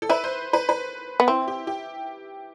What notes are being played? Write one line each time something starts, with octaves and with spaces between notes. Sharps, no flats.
A4
E4 B4
C5
B4
B4
B3
C4 E4
G4
G4